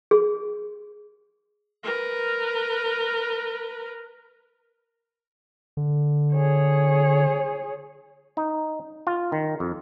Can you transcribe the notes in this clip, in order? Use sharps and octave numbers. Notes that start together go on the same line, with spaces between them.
G#4
A#4 B4
D3
G#4 C#5
D#4
F4
D#3
F2